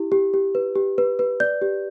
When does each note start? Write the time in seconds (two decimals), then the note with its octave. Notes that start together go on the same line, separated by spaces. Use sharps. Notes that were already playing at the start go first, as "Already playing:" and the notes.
Already playing: E4 G4
0.12 G4
0.34 G4
0.55 B4
0.76 G4
0.98 B4
1.19 B4
1.40 D5 G6
1.62 G4